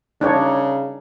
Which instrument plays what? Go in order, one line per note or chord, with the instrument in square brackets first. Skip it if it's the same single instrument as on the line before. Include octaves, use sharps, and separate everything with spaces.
[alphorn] C#3 [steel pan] D4 D#4 C#5